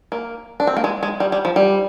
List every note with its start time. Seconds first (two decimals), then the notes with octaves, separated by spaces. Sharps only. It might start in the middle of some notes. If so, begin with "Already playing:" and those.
0.12 A#3
0.60 D4
0.67 C4
0.77 A#3
0.84 G#3
1.03 G#3
1.20 G3
1.32 G3
1.45 F3
1.56 G3